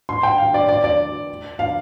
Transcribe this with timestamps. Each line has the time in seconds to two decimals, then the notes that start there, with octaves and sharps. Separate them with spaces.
0.09 C6
0.23 G5
0.38 F5
0.54 D5
0.69 D5
0.84 D5
1.59 F5